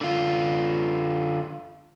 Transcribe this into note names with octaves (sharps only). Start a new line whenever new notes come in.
D3 F4